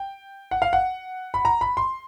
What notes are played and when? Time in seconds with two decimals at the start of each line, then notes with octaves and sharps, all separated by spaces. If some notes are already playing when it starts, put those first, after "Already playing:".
Already playing: G5
0.51 F#5
0.62 F5
0.73 F#5
1.34 B5
1.45 A#5
1.61 B5
1.77 C6